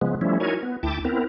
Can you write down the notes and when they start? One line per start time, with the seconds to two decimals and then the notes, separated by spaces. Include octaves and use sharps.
0.01 C#3 F3 G#3 B3
0.21 F3 G3 A3 C#4 E4
0.40 D#4 E4 F#4 A#4 C#5 G#5
0.63 B3
0.83 D2 E4 G5 A5 D6
1.05 B3 C4 E4 A#4